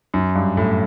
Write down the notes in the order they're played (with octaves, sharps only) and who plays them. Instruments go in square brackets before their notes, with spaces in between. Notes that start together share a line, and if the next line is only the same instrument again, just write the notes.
[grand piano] F#2
G2
A2